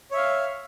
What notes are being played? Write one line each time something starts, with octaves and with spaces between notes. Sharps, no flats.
C#5 E5 F5